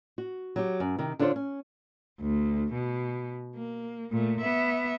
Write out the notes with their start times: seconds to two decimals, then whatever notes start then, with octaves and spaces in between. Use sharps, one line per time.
0.18 F#4
0.56 F#3 G4
0.80 F#2
0.98 C3 D#3
1.19 D3 D4 E4 F4 C5 C#5
1.36 C#4
2.21 D2
2.73 B2
3.56 A#3
4.12 A#2 A3
4.41 B3 E5